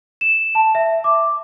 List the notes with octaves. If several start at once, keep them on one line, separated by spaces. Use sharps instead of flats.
E7
A5
E5
D6